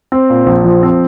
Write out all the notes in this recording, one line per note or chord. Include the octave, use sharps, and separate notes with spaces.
C4
A#2
A#1
F3
C4